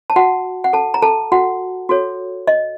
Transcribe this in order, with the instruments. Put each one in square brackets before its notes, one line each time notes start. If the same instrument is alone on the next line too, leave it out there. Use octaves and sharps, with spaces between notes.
[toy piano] A5
F#4 F#5
F#5
A4 A5
A#5
A4 A5
F#4 F#5
F#4 A4 C#5
D#5